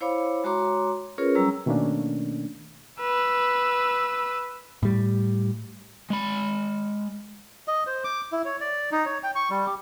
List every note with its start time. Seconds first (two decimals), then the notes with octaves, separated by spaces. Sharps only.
0.01 E4 C5 C#5 F5 B5 D6
0.44 G#3 F#4 C#5 A#5 C6 D6
1.18 C#4 F4 G#4 A#4 B4 C#5
1.35 F#3 G3 C#4 A#5 E6
1.66 B2 D#3 A3 A#3 C#4 D4
3.01 B4 E6
4.83 A2 G3
6.10 G#3 B5
7.68 D#5
7.87 C5
8.04 D6
8.32 E4
8.45 C#5
8.60 D5
8.92 D#4
9.06 C#5
9.23 G5
9.36 C#6
9.50 G3
9.66 G4